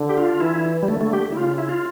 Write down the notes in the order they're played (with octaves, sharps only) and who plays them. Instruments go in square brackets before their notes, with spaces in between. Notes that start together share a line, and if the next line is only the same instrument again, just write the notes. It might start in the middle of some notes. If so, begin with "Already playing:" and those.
Already playing: [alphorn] D3
[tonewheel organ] G4
F4
[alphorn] E3 [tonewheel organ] E4
[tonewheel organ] G3
[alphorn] D3 [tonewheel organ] A3
[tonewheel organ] A3
G4
E4
[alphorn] C#3 [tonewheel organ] F4
[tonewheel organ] E4
F4